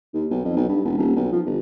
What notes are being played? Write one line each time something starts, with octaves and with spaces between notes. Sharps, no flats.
D#2
B1
F2
B1
G2
E1
D#1
B1
F3
G1